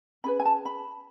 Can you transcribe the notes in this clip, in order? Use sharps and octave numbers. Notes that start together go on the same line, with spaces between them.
C#4 G#4 B4 B5
G#5
A5
B5